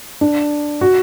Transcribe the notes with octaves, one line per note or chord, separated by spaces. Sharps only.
D4
F#4